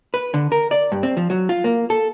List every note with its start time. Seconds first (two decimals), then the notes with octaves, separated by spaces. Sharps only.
0.14 B4
0.34 D3
0.52 A#4
0.71 D5
0.92 G2
1.03 C4
1.17 F3
1.30 F#3
1.49 F4
1.64 A#3
1.90 A4